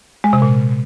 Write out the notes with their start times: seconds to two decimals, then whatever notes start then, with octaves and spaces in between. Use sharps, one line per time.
0.24 G#3
0.33 C3
0.42 A#2